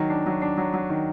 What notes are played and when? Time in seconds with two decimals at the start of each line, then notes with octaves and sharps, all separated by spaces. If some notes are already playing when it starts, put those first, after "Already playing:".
Already playing: D#3 F#3
0.10 D4
0.26 F#3
0.42 D4
0.58 F#3
0.74 F#3
0.89 D#3